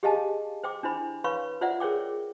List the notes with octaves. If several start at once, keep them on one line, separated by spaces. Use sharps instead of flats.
G4 G#4 D#5 F5 G#5 A5
C5 G5 D6
D4 E4 C5 B5
B4 C#5 F5 B5 C#6
F4 C5 D5 E5 F#5
G#4 A#4 C#5 G5 D6